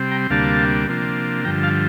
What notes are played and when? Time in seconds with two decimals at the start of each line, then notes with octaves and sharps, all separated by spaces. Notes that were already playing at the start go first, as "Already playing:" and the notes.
Already playing: C3 G3 C4
0.11 G5 A#5
0.30 D2 C3 G3 A#3 D4 F5 A5
0.88 C3 F3 A#3 D4
1.45 G2 D3 F3 G5 A#5
1.63 F5 A5